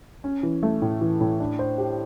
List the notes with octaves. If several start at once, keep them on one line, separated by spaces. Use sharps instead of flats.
C#4
E3
A3
A2
E3
A2
D4
C5
G4